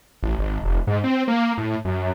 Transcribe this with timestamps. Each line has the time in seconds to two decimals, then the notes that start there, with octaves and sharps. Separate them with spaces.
0.23 A1
0.38 G#1
0.63 F1
0.87 G#2
1.04 C4
1.28 A#3
1.58 A2
1.85 F#2